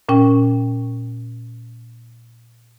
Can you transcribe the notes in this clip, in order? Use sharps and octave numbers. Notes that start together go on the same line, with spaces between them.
A#2 C#4 G5